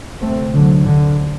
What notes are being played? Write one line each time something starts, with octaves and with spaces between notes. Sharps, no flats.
D2 C3 A3 C4
D3 F#3
D3